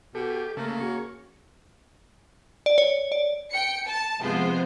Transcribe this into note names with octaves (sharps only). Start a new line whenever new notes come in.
B2 G4 A4
C#3 A3 A#3
C#4 F#4 G#4 C#5
D5
C#5
D5
G5 C#7
A5
C3 F3 G#3 B3 F4 C5